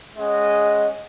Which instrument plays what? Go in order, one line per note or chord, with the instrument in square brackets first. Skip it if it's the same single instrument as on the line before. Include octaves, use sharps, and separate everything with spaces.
[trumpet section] G#3 C#4 G#4 D#5 F#5